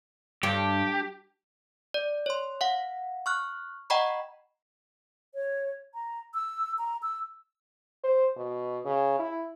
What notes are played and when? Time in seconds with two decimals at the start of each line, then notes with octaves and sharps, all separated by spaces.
0.43 G2 G4
1.94 D5
2.26 C#5 C6
2.61 F5 F#5
3.26 C#6 F6 F#6
3.90 D#5 F#5 G5 A#5 B5 C#6
5.34 C#5
5.94 A#5
6.34 E6
6.78 A#5
7.02 E6
8.04 C5
8.37 B2
8.85 C#3
9.19 E4